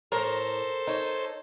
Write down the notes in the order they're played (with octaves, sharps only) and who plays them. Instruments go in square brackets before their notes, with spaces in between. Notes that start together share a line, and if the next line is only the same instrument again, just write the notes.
[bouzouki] A2 [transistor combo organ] A4 C5 [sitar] A#4
[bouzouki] D#4 C#5